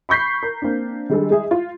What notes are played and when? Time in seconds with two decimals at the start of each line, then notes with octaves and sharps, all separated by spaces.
0.09 B5 C#6 G6 B6 C7
0.43 A#4
0.62 A#3 C4 D4
1.09 D#3 G3 G#3 D4 D#4 A4
1.30 G#3 G#4 E5
1.51 F4